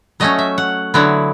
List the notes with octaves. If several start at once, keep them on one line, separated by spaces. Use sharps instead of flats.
F#3 A3 C#4 D#5
E5
F#5
D3 F#3 B3 E4